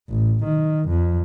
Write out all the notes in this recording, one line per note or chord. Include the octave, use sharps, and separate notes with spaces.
A1
D#3
F2